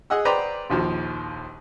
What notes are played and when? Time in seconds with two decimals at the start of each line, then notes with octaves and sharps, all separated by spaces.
0.10 G#4 D#5 F#5 E6
0.25 B4 C5 D5 G5 A#5
0.70 A#1 D#2 F3